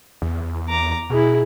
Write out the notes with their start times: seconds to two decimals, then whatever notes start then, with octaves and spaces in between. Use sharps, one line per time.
0.22 E2
0.69 A#5 D6
1.10 B2 E4 G#4